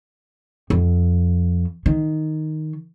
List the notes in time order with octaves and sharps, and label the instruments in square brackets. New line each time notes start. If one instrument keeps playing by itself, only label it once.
[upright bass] F2
D#3